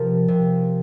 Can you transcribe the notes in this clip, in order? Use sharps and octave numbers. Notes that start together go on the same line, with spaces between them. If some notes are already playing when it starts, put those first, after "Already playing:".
Already playing: C3 F3 A#4
C3